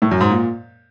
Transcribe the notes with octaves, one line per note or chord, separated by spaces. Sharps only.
A2
F#2
G#2
A#2